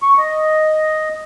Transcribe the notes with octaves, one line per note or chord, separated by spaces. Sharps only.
C#6
D#5